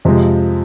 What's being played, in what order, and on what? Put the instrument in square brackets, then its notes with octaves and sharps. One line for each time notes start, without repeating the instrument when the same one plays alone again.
[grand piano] F2 C3 F3 G#3